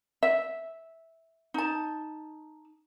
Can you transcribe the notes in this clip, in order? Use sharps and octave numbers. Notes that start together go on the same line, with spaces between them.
E5
D#4 A5